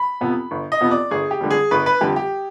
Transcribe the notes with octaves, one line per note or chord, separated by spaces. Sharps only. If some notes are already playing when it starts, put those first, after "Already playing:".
Already playing: B5
F2 C3 F3 B3
G1
D#5
F2 C3 F3 B3
D5
G1 G#4
G4
F2 D3 G3
G#4
G1 B4
B4
F2 D3 G3 G4
G4